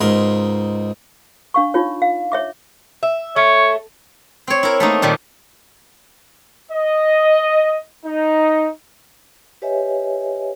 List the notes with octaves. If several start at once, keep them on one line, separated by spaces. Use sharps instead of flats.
C#2 G#2 A#4 C6
D4 F5 C#6
D#4 F4 C#5
F5
C#5 E5 D6
E5
A3 C#5
C4 C#5
E4 A#4
A3 A#3 D#4
A#2 D#3 G3
D#5
D#4
G4 B4 C#5 D#5 E5 G#5